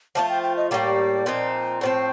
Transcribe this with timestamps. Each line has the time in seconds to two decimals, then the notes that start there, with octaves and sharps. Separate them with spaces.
0.15 F3 A3 D4 F4 A5
0.29 G5
0.43 G5
0.57 D#5
0.70 A2 G3 A#3 D5
1.26 A#2 F3 C4 D#4
1.81 A2 F3 A3 C4 C5